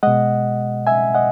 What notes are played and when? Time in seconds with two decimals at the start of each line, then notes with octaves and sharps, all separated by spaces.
0.03 B2 G#3 D#5 F#5
0.87 E5 G#5
1.15 D#5 F#5